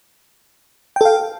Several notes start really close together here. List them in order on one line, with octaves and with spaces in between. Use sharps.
G5 A4 F5